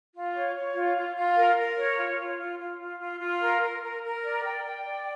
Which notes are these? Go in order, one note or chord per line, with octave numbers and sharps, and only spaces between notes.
F4
C#5
C#5
F4
F4
F4
A#4
A#4
C#5
F4
F4
F4
F4
F4
F4
F4
A#4
A#4
A#4
A#4
D5
G5
G5
D5